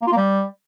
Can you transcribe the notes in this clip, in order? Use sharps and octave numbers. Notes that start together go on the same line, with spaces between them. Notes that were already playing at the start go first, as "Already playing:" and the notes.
A#3
F4
A#3
G3